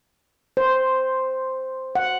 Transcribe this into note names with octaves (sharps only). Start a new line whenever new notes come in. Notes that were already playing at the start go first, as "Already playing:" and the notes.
C5
F#5